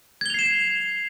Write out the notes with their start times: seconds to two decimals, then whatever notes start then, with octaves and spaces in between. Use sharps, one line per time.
0.21 G#6
0.26 G7
0.30 F7
0.34 C7
0.39 E7